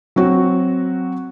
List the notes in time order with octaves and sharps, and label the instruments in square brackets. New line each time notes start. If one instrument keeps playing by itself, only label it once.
[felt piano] F#3 C4 F#4